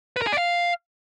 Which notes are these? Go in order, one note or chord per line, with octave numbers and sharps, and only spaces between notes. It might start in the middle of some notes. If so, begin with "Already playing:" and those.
B4
A#4
G#4
D5
F5